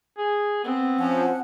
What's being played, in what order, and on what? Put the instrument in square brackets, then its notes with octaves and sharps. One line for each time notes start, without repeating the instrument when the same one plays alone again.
[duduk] G#4
[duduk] B3 [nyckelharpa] C4
[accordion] F3 [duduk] C#4 [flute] F#5